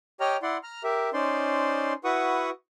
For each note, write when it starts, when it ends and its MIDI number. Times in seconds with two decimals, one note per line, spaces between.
0.20 0.37 67
0.20 0.37 73
0.20 0.37 75
0.20 0.37 79
0.20 0.37 82
0.20 0.37 89
0.42 0.57 64
0.42 0.57 74
0.42 0.57 78
0.42 0.57 84
0.63 0.83 82
0.63 0.83 89
0.84 1.10 67
0.84 1.10 70
0.84 1.10 76
1.13 1.93 61
1.13 1.93 63
1.13 1.93 72
1.13 1.93 74
1.13 1.93 84
2.04 2.50 64
2.04 2.50 66
2.04 2.50 71
2.04 2.50 78
2.04 2.50 85
2.04 2.50 87